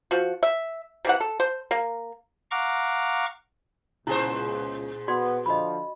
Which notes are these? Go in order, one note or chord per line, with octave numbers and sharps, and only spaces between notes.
F3 F#4
E5
C3 E3 F#5
A4
C5
A#3
F5 F#5 A#5 C#6 D6
C#2 A#2 E4 G#4 C5
B3 F#4 D5 C6
D3 F3 D#5 B5